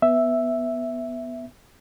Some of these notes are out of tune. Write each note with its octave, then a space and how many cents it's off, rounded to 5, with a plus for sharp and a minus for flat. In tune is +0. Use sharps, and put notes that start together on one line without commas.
B3 +0 E5 +0